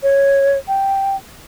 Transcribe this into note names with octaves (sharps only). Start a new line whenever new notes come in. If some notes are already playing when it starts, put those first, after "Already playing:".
C#5
G5